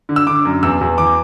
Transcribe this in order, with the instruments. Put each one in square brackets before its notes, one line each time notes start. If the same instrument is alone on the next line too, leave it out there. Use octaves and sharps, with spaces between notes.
[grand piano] D3
E6
D3 D6
F#2
E2 E6
E2
E3 D6